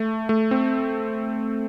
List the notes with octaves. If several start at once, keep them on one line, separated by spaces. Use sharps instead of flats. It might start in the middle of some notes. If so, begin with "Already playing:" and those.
Already playing: A3
A3
C4